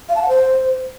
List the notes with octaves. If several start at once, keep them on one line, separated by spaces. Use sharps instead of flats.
F5
A5
F#5
C5